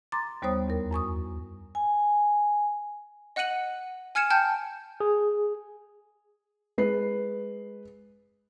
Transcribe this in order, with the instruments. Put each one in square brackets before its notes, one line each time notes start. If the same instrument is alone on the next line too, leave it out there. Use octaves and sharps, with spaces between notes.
[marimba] A#5 C6 D6 A6
D#2 G3 B3 C5 C#5 D#6
E2 A#4
F#2 G#5 C#6 D#6
[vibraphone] G#5
[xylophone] D#5 F#5 F#6 C#7 D#7 F#7
G#5 F6 G#6 C#7 E7
G5 A5 F6 G6
[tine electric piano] G#4
[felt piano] G#3 B4 C7